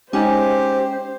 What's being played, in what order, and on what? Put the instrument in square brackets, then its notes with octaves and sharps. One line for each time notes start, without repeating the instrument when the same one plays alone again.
[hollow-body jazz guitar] G#3 D#4 G#5 [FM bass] C#4 [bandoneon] G4 [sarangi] C5